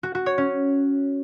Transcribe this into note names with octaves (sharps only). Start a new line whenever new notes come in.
F#4
F#4
C#5
C#4